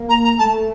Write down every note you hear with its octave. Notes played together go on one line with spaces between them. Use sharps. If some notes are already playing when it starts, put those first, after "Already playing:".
Already playing: A#3
A#5
A#5
A3 A5